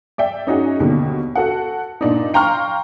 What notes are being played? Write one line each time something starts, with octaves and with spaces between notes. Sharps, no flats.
D5 E5 G5
C#4 D#4 F#4 G#4
D#2 B2 D3
F#4 A4 F#5
A#2 D4 D#4
F5 G5 A#5 C6 C#6 F6